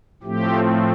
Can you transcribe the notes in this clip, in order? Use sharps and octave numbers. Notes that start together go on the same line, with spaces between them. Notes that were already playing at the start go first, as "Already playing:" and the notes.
A2 F3 A3 C4 G4